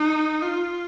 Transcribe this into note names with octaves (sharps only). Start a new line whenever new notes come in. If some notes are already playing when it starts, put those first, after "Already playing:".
Already playing: D#4
F4